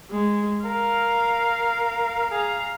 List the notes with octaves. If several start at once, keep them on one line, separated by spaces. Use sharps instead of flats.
G#3
A#4 F5
G#4 F5 A#5